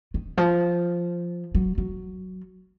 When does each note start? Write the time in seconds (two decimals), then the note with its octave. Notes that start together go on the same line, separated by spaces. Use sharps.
0.14 D#3
0.37 F3
1.55 F#3
1.78 F#3